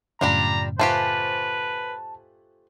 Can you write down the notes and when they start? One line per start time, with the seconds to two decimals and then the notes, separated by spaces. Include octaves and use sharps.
0.21 F#2 A2 C#3 G3 D4 F4 A#5
0.79 A3 F4 G4 B4 C5 G#5 A5 F#6